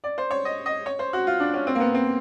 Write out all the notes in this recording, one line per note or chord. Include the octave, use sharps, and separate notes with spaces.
D5
C5
C#5
D#5
D#5
C#5
C5
F#4
F4
D4
C#4
C4
A#3
B3
C4